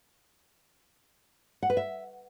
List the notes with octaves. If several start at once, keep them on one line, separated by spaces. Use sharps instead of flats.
F#5
B4
E5